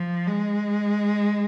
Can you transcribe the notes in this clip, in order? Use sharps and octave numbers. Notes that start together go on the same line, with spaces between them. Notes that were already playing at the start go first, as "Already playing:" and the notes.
Already playing: F3
G#3